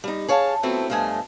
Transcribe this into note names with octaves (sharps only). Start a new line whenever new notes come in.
G3 D#4
G#4 C#5 F5 A5
F3 F#3 A3 B3 C4 E4
G2 F3 A3 D#5 G#5